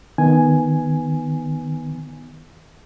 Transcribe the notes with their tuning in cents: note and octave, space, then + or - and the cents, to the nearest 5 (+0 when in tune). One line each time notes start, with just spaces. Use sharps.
D#3 +0 B3 +0 G#5 +0